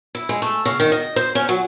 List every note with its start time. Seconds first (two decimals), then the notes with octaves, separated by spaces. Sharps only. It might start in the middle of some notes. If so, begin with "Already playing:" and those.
0.15 E4
0.29 G#3
0.42 A3
0.65 C#3
0.80 D#3
0.92 D#5
1.16 C5
1.35 C#4
1.49 F#3